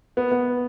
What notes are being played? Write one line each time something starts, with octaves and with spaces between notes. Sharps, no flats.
B3
B3